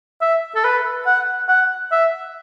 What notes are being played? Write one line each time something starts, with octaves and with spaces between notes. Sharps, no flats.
E5
A4
B4
F#5
F#5
E5